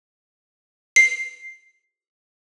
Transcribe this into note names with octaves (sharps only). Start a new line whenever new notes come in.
C7